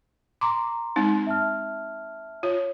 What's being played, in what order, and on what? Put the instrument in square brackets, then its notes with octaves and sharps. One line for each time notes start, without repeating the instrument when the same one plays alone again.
[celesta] A#5 C6 [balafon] D6
[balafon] G#3 C4 D#4
[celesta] E5 A5 F6
[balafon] F4 [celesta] C#5